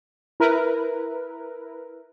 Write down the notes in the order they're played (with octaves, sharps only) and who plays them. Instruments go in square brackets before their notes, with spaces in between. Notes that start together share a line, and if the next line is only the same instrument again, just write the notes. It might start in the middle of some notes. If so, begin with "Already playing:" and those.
[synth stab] E4 A#4 B4